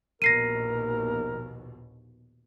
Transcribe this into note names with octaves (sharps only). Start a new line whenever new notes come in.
A#1 D#2 B2 A#4 A#6 C7 D#7